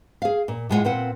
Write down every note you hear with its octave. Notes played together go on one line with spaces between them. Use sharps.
G#4 F5
A#2
A2 G#3 A#3 F4 F#5
A#2 C4 B4 F#5